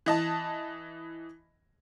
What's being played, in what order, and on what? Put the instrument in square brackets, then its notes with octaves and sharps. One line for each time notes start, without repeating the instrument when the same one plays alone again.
[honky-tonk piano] E3 D#5 A5